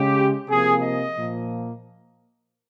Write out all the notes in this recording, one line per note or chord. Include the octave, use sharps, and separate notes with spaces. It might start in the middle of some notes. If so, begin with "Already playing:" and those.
Already playing: C#3 G#3 G4
C3 F3 A#3 G#4
D#5
A#2 F3 A#3